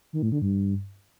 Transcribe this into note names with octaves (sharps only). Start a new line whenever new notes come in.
D#3
A2
D3
G2